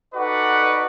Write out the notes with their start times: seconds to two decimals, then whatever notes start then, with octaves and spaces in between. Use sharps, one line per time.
0.15 D#4 F#4 A4 B4 D5 F#5